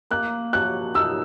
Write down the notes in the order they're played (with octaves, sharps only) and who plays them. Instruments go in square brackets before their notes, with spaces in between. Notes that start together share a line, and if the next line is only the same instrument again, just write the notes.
[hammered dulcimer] A#3 [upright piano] F#6
[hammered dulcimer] F#3 [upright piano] F#6
[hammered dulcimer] D#4 [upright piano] E6